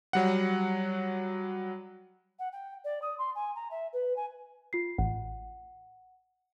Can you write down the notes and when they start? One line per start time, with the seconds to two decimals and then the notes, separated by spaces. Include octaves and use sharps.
0.13 F#3 G3 F#5
2.39 F#5
2.52 G5
2.84 D5
3.02 D#6
3.18 C6
3.35 G#5
3.56 A#5
3.71 E5
3.93 B4
4.16 G#5
4.73 F4 C7
4.98 A1 F#5